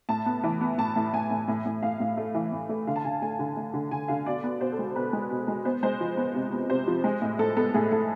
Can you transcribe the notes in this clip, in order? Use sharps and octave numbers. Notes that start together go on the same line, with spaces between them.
A2 A5
B3
E3
B3
A2 A5
A2
A2 G#5
A2
A2
A2
A2 F5
A2
A3
E3
A2
A3
D3 F5
A5
D3 G#5
A3 G#5
D3
A3
D3
D3 G#5
D3 F5
B2 D5
B3
B2 C5
A4
G#3
B2 B4
G#3
B2
G#3
B3 C5
G#3 C5
F3
B3
C3
B3
C3 C5
F3
G#3
A2
A2 A4
B3 A4
A2 G#4
A2 A4